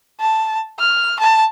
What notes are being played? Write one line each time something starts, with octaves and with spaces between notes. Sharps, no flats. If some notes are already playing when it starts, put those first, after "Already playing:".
A5
F6
A5